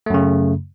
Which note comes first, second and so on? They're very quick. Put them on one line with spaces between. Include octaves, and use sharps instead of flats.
A3 F#2 C#3